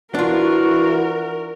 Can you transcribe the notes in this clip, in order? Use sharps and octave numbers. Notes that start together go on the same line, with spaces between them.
E3 D4 F4 F#4 A#4